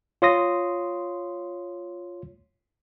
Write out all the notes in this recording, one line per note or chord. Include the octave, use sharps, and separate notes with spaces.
F4 C#5 C6 D#6 A#6